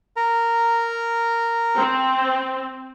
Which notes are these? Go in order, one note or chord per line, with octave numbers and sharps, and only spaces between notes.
A#4 A#5
C4